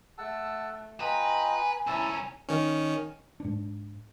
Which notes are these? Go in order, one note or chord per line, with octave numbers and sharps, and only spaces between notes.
A3 F#5 A5 E6
F4 B4 D#5 G5 G#5 A#5
C2 C#4 E4 A5 A#5 E6
D#3 C#4
G#2 D4